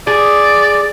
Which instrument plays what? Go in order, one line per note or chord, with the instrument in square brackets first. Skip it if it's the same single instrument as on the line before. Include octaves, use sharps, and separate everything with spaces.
[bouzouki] G#4 [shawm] D5